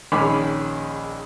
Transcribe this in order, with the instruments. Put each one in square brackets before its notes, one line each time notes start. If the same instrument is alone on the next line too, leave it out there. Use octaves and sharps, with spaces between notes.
[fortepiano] A#1 D#3 C#4 G#4 B5 D6